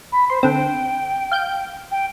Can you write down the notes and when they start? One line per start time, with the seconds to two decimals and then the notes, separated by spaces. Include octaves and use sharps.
0.12 B5
0.30 C5 C6
0.43 D3 C4 G5
1.32 F5 G6 D7
1.91 G5